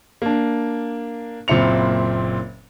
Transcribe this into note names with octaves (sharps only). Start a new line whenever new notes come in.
A#3 D4
F#1 A#2 C4 E4 C#7 F7